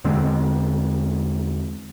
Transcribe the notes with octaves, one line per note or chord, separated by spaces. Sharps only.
E2 D3 G#3 C4